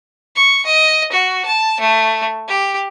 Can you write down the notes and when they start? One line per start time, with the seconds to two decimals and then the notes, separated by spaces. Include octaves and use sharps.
0.35 C#6
0.66 D#5
1.12 F#4
1.45 A5
1.80 A3
2.48 G4